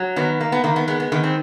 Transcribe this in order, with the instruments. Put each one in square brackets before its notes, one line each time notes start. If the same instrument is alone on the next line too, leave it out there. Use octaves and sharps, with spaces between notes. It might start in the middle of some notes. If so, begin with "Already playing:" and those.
Already playing: [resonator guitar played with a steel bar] F#3
D#3 B3
A#3
B3
D#3 A#3
B3
G#3 B3
B3
D#3 B3
C4